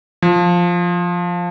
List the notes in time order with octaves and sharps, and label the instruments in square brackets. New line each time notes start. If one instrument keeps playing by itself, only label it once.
[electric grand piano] F3